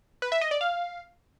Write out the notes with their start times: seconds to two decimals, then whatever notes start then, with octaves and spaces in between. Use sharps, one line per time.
0.22 B4
0.32 E5
0.41 D#5
0.51 D5
0.61 F5